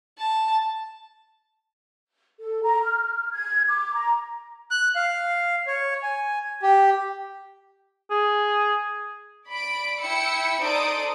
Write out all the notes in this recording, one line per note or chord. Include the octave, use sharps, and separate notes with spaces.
A5
A4
A#5
F6
G#6
D6
A#5
F#6
F5
C#5
G#5
G4
G#4
D5 B5 D7
E4 G5 E6 C#7
D#4 A4 C5 D5 D#6 D7